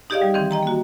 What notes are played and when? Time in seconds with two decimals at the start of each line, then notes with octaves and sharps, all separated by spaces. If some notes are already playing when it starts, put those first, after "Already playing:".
0.10 D#4 G4 G#4 D5 D#5 F5
0.22 G3
0.34 D#3 E3 C4
0.51 D#5 G5 A#5
0.63 A#3 F#4